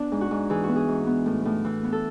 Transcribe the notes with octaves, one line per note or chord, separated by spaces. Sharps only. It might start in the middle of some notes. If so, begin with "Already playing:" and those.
Already playing: B3 D4
G#2
F#4
G#2
E3 G#4
B3 F#4
G#4
G#2
B3
A2
A2
E3
B3
A4